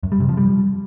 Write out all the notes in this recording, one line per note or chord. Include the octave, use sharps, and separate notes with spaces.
F#2
G3
C3
F3
G3